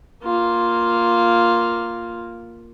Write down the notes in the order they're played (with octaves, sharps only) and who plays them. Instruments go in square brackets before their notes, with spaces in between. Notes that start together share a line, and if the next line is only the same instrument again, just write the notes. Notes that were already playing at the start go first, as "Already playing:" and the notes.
[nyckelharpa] A#3 F4